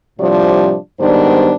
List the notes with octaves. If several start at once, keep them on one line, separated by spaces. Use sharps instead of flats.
A2 C3 F3 G3 D4 D5
G#2 D#3 G3 B3 D4 C5